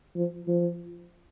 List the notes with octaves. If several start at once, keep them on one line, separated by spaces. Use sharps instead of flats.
F3
F3